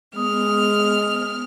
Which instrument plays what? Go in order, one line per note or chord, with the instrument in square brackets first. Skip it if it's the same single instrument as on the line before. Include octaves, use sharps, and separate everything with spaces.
[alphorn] G#3 [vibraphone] B3 D#6 [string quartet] F6